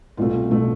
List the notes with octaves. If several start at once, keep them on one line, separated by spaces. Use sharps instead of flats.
C2 B2 A3 F4
B2 A3